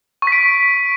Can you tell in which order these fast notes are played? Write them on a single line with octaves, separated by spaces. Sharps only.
C#6 B6 D7